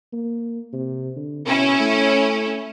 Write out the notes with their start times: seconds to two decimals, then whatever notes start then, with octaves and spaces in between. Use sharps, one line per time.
0.13 A#3
0.73 C3
1.16 D3
1.47 B2 C#4 E4
1.80 A3